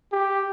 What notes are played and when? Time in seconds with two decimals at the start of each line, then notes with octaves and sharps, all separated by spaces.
0.12 G4